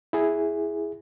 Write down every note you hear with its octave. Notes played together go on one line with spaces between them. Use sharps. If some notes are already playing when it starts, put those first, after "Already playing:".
E4 G#4